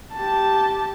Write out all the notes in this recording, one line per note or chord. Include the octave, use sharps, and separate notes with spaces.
G4 A5